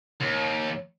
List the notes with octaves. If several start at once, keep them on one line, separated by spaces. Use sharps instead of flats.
D#2